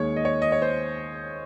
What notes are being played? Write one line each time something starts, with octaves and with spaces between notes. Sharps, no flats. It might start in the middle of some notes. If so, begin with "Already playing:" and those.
Already playing: D#2 D#3 G#3 C#5
D#5
C#5
D#5
C#5
C5